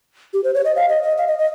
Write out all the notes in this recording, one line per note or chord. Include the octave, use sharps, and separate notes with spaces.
G4
C5
C#5
D#5
F5
D#5
D#5
F5
D#5
D#5